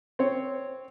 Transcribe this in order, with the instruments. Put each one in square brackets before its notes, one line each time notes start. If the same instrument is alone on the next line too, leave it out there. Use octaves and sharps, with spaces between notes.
[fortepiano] C4 C#5